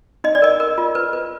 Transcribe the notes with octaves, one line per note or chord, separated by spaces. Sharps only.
D#4 D#5
D5
A#4 D#5
A#4
F4
B4
B4